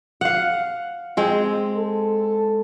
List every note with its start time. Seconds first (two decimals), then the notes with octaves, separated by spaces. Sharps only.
0.21 F5 F#5
1.17 G#3 C4
1.77 A4